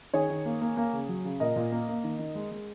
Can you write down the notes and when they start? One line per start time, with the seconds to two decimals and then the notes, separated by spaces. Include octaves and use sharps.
0.13 D#3 G#4 C#5
0.30 D#3
0.45 A#3
0.61 A#3
0.77 A#3
0.93 C#3
1.08 F#3
1.24 C#3
1.40 A#2 A#4 D#5
1.56 A#2
1.72 A#3
1.88 A#3
2.04 D#3
2.19 D#3
2.35 G#3
2.51 G#3